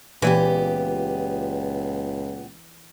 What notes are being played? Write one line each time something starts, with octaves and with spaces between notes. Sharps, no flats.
C#2 A#2 E3 B3 G4